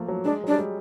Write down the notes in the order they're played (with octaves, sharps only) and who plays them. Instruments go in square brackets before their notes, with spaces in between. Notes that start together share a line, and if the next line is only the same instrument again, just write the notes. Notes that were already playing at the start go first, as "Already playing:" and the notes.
Already playing: [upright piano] F3 A3 A#3
F#3
[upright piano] G#3 [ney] D4
[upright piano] F#3
[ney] D4
[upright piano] G3
G#3